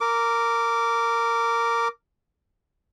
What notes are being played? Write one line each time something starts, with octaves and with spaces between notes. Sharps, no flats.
A#4 D6